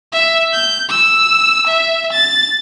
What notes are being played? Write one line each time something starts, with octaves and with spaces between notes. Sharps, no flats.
E5
G6
E6
E5
A6